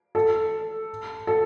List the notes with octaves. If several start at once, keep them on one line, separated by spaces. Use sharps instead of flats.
A4
A4